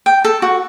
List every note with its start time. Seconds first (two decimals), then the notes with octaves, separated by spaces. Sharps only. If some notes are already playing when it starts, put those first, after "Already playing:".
0.06 G5
0.24 A4
0.42 F#4